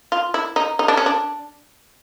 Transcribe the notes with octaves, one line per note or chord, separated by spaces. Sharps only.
F4
E4
D#4
D#4
D4
C#4
D4